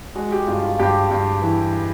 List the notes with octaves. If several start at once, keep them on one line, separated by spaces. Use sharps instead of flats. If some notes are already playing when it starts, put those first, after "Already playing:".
G#3 F#4
G4
G2 F4
F4
G2 G4
G2
E3